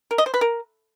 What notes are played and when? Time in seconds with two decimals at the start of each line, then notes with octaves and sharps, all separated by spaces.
0.11 A#4
0.18 D#5
0.26 C5
0.34 B4
0.41 A#4